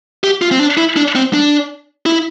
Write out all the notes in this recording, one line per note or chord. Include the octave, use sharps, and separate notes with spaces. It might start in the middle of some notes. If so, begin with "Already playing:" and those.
G4
F4
C4
D4
E4
D4
C4
D4
E4